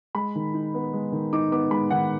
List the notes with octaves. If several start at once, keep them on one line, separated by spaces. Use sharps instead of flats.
G#3 B5
D#3
D#4
B3
G#3
D#3
D#4 D6
B3 D6
G#3 B5
D#3 F#5